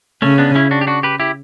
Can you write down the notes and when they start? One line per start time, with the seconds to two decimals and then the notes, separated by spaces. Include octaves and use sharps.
0.22 C#3 A3 C#4
0.38 B3 D4
0.55 C#4 E4
0.71 D4 F#4
0.81 G4
0.87 D4 F#4
1.03 G4 B4
1.20 E4 G4